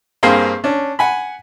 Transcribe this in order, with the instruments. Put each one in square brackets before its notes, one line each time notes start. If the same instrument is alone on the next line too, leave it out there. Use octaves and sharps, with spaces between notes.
[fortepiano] G2 A#3 C4 G#4 F5 C6
C#4 D4
F#5 G#5 B5